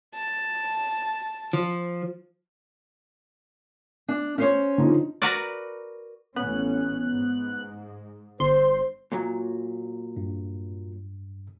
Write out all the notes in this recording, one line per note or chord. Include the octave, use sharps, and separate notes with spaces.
A5
F3
D4
C#4 C5 C#5
D3 F3 D#4
F#4 A#4 B4 D5
A1 B3 C#4 F#6
G#2
G1 C5 C6
A#2 F#3
G2